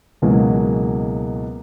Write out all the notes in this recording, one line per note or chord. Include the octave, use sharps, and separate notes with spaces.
C#2 B2 E3 F#3 G#3 A#3